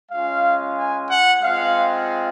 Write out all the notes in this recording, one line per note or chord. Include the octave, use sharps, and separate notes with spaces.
G#3 C#4 F4 F5
G#5
F#5
G#3 C4 F4 F5